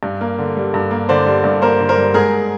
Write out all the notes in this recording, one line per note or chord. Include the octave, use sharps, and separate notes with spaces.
G2
A#3
D3
G3
G2
A#3
D3 C5 D5
G3
G2
A#3 A#4 C5
D3
A#4 C5
G3
G#2 G#4 A#4